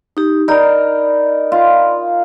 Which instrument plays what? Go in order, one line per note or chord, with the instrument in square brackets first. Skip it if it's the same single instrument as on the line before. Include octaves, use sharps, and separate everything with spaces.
[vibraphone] D#4 G4
[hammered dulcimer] D#4 A#4 [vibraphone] D5 B5
[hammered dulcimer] F4